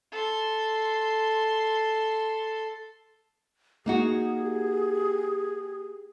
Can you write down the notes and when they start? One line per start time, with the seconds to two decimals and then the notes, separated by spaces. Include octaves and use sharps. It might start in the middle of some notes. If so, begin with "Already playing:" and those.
0.12 A4 C6
3.86 A#3 D#4 F#4 G#4
4.41 G4